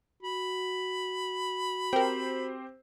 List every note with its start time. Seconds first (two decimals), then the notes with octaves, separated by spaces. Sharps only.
0.23 F#4 B5
1.93 C4 G4 A#4 C5 G5